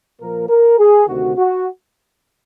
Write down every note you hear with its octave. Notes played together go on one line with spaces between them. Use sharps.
A#2 F3 A#3 A#4
A#4
G#4
D2 C3 D#3 F#4
F#4